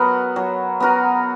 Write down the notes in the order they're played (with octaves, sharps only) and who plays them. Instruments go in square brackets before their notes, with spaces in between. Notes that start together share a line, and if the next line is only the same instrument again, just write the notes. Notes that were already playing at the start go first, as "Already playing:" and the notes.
Already playing: [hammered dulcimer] F#3 B3 F#4 A#4
F#3
B3 F#4 A#4